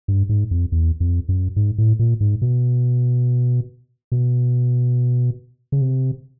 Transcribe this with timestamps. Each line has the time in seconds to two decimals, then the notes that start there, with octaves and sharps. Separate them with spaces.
0.08 G2
0.29 G#2
0.51 F2
0.72 E2
1.00 F2
1.29 F#2
1.56 G#2
1.78 A2
1.99 A#2
2.20 G#2
2.42 B2
4.12 B2
5.72 C#3
5.81 C3